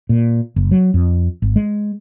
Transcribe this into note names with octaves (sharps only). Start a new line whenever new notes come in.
A#2
F#1
F#3
F2
G#1
G#3